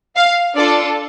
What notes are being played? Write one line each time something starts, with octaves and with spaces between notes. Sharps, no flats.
F5
D4 F4 A4 D5